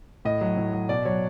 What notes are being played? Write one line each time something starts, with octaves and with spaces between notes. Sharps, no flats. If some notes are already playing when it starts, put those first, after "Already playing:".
A2 D#5
F#3
A2
F#3
B2 D5
F#3 C#5